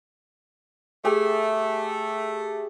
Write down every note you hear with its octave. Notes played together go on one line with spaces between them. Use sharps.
A3 G4 G#4 E6